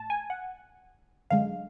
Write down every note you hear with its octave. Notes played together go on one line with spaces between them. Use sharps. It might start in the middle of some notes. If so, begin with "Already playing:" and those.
Already playing: A2 A5
G#5
F#5
F#2 D3 G#3 F5